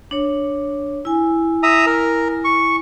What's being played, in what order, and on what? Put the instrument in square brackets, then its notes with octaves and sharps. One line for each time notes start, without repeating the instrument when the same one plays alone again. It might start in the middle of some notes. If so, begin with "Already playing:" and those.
[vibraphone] D4 C#5
E4 G#5
[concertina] E5 A#5 D#6
A#4
C#6